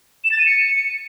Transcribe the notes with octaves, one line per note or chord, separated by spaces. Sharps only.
E7
A6
D#7
C#7